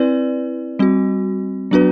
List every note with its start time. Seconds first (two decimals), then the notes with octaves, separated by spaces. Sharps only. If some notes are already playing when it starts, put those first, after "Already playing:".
Already playing: C4 E4 B4 D5
0.79 G3 C4 F#4
1.71 F#3 B3 D4 F#4 B4